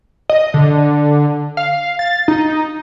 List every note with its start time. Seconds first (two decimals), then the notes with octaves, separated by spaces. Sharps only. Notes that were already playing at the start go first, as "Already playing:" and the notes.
0.30 D#5
0.54 D3
1.57 F5
1.99 A6
2.28 D#4